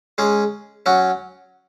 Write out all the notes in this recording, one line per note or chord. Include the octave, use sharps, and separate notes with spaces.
G#3 C#4 G#4
F#3 C#4 F#4